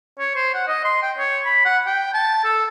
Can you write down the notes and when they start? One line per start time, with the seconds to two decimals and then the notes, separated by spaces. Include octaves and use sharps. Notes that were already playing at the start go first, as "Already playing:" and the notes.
0.19 C#5
0.36 C5
0.54 F#5
0.68 D#5
0.85 C6
1.03 G5
1.18 C#5
1.46 B5
1.65 F#5
1.87 G5
2.14 A5
2.44 A4